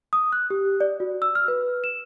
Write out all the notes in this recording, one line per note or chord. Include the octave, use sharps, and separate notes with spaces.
D#6
F#6
G4
D5
F#4
E6
F6
B4
E7